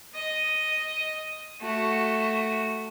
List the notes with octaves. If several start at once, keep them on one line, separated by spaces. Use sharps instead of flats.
D#5
A3 F#4